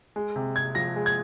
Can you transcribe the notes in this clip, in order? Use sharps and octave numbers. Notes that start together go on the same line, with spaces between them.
G#3
C3
C3 G#6
F3 A#6
G#3
G#6